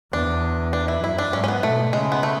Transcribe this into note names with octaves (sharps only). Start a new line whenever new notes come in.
E2 D4
D4
E4
F#2 E4
D4
G#2 C#4
C#4
B3
B2 A3
C#3 G#3
B3
A3